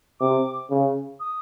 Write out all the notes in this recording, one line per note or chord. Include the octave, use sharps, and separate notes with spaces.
C3 D6
C#3
D#6